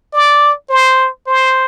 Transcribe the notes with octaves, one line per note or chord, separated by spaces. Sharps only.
D5
C5
C5